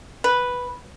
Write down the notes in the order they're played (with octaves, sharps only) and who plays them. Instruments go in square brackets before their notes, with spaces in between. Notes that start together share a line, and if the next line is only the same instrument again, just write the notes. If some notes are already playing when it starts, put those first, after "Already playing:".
[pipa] B4